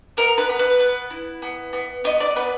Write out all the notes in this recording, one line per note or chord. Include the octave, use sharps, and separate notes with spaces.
B3 A#4
B4
B3
B4
B3
E4
B3
B3
B3 D#5
D5
B3 B4